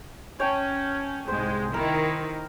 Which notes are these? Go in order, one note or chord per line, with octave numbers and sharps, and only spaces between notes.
C#4 C#5 G5 A5
C2 G#2 G#3 C5
D#3 E4 A#4